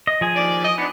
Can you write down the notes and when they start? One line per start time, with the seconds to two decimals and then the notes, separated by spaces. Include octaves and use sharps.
0.07 D#5
0.21 F3 G#4 G#5
0.36 D#2 D5
0.64 D#5
0.78 B3 D4 D#4